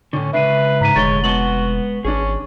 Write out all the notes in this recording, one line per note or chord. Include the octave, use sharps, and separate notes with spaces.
A2 D3 C#4
C#2 D4 B4 E5 C7 D#7
G#2 A#5 B6 D#7
F1 A2 D3 G#3 C#5 A6 G7
G#3 B3 F#4 A5 F#7 G7
G#1 C#4 D4 G#4